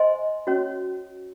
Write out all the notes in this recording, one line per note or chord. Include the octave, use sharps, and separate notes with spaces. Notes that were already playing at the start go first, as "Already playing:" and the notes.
Already playing: C5 D#5 G#5 C6
C#4 F#4 C#5